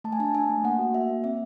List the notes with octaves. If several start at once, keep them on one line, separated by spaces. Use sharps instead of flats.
A3 A5
G#5
D4 A5
D4 G#5
A3
A#3 F#5
F#4
A#3 E5
A#3
C4 E5